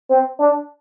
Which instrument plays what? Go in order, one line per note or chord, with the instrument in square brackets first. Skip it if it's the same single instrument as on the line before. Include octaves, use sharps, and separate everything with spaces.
[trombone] C4
D4